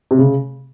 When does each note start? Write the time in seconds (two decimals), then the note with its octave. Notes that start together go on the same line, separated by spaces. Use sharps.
0.11 C3
0.18 C#3